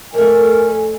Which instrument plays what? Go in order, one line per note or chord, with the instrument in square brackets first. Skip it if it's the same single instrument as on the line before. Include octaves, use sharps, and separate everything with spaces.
[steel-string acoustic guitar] F2 A3 [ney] A#4 [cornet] G#5